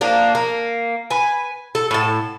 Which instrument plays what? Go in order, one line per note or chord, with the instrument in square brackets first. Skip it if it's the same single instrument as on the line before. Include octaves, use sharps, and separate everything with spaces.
[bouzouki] F3 A#3 D4
A#3
B4 G#5
A4
A2 A5